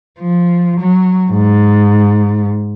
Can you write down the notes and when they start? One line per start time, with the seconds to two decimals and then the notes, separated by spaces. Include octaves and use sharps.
0.20 F3
0.80 F#3
1.31 G#2